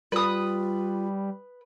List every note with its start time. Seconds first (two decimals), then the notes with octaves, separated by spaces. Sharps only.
0.12 G3 F4 B4 D#6